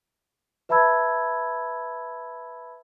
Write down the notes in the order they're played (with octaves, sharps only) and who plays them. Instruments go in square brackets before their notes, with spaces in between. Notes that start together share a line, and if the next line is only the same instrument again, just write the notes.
[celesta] B4 E5 A5 B5 E6 G#6